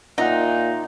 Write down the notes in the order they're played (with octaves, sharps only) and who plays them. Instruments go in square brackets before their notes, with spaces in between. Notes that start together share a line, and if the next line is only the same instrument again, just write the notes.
[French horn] A#2 [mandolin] D#4 [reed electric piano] F4 E5 F#5